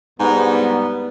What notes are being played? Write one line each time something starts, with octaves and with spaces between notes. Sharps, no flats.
C2 G#2 G3 B3